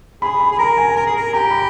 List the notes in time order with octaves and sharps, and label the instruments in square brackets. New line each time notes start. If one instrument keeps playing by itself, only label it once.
[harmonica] G#4 [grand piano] B5
[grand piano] B5
[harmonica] G#4
[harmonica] A#4 [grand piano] A#5
[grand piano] G#5
[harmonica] A#4 [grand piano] A#5
[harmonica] G#4
A#4
[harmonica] G4 [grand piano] A#5
[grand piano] B5